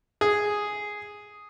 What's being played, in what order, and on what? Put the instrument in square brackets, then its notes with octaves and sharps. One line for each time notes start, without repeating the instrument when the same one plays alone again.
[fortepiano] G#4